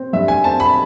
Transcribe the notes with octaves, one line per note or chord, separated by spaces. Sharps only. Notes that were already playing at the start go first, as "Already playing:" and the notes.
Already playing: C4
G2 E5
G#5
C4 A5
B5